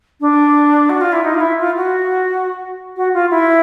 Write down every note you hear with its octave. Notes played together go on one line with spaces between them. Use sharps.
D4
F#4
F4
E4
D#4
F4
E4
F4
F#4
F#4
F4
E4